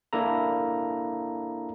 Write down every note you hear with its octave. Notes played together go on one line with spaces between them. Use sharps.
A#3 D4 E4 A4 A#5